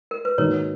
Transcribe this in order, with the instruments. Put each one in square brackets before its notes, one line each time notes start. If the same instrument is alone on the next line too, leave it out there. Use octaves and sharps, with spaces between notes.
[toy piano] A#4
B4
[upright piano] G#2 D#3 A#3 D#4 F#4 [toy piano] A#4 C#5